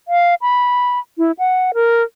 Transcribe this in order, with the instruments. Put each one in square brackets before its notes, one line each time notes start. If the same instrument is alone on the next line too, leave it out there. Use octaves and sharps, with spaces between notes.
[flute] F5
B5
E4
F#5
A#4